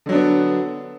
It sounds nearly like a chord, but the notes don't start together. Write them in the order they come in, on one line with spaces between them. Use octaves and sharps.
D3 F#3 D4 B3